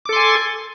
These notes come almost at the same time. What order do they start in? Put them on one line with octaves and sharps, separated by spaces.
D6 A4 C6 G#5